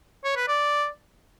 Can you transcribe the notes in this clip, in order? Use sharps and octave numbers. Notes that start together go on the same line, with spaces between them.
C#5
B4
D5